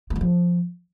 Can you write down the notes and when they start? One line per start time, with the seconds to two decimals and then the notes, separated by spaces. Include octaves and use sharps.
0.10 A#3
0.16 G3
0.21 F3